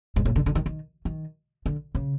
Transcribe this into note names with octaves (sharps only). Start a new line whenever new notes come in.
G#2
A2
D3
D3
D#3
D#3
D#3
D3
C#3